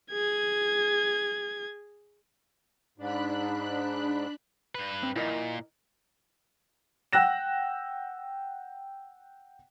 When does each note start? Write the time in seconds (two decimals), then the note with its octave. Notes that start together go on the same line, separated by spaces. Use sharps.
0.11 G#4 G#6
2.98 G#2 D4 B5 F#6
4.75 G2 B4
5.03 C4
5.16 A#2 E4 A#4 D#5
7.13 F#5 G5 E6 F#6 A#6 E7